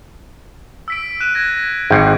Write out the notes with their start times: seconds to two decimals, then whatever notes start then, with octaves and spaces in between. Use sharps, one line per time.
0.88 E6 B6 D7
1.20 F#6 D#7 E7
1.35 F#6 G#6 A#6
1.90 G#1 G#2 G5